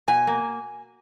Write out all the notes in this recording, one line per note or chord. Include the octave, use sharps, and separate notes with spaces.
B2 G#5
A#3